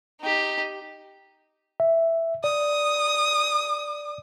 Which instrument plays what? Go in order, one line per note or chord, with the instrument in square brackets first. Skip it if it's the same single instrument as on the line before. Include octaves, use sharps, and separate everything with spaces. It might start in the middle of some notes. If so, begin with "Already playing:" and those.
[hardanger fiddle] D#4 G4
[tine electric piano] E5
[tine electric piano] D5 [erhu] D#6